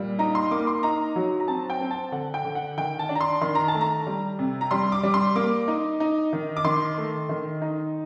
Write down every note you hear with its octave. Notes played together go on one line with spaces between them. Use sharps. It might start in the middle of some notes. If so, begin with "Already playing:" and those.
Already playing: A#2 G3
D#4 A#5
C6
A#3 D6
C6
D#4 A#5
F#3
A#5
C4 A5
G5
C4
A5
D3 F#5
G5
D3
F#5
D#3 G5
A5
D4
A#5
C6
D#3 C6
A#5
A5
A3
A#5
G3
C3
A#5
G3 C6
D6
G3
C6
A#3 D6
D#4
D#4
D#3
D6
D#3 C6
A3
D#3
D#4